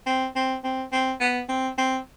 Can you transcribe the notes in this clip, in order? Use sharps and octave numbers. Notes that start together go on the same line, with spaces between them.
C4
C4
C4
C4
B3
C4
C4